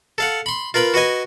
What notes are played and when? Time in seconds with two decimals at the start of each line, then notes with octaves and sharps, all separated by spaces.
0.18 A4 F5 F#5
0.46 B5 C6
0.74 F4 A#4 B4 B5
0.94 F#4 B4 D#5 G#5